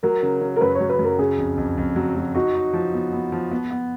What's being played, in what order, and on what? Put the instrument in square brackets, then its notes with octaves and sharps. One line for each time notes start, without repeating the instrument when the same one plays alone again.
[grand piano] F#3 [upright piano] A#4
[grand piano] C#3
C#3
[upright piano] A#4
[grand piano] F#2 [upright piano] B4
[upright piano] C#5
[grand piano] F#2
[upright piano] B4
[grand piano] F#2 [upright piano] A#4
[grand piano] C#3 [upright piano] G#4
[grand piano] F2
F2
F2
F#3
F#3
[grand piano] D#4 [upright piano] F#4
[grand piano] D#4
F3
B3
B3
F3
B3
B3